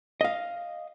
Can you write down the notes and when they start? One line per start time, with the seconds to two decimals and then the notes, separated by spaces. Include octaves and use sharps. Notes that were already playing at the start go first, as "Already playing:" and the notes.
0.21 D#5 F5